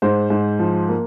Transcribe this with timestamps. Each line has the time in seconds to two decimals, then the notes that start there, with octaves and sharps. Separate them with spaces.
0.02 G#2 C5
0.30 G#2
0.59 F3
0.89 A#3